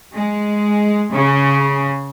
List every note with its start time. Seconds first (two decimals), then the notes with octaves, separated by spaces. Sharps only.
0.15 G#3
1.12 C#3